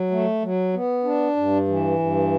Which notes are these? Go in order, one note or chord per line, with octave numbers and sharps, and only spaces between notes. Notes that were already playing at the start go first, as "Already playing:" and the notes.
Already playing: F#3
A3
F#3
B3
D4
G2
E3
G2